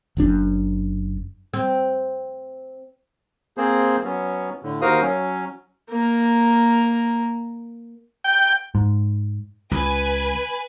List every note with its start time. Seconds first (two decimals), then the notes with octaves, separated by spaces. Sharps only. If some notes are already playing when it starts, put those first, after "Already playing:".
0.17 F#1 F#2 D4
1.53 C4
3.57 A#3 C4 G#4 C5
4.04 F#3 B3 C#4
4.63 A2 D3
4.82 D#2 F#4 A#4 C5 F5 D#6
5.02 F#3 C#4
5.89 A#3 A#4
8.24 G5
8.75 G#2
9.71 C#2 B4 G#5